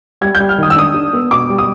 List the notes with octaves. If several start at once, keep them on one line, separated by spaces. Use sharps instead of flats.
G3 G#6
G6
G3
F6
D#3 D#6
E6
D4 D#6
D4
B3
B2 D6
G3
D#6